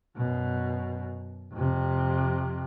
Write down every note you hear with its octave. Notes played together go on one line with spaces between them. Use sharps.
F#2 B2
F2 C3